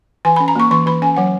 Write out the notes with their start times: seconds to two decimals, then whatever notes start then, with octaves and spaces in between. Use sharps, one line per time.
0.25 E3 G#5
0.36 B5
0.40 C#4
0.48 A#5
0.56 A#3 C#6
0.71 E3 C#6
0.86 E3 B5
1.02 C#4 G#5
1.16 F#3 F#5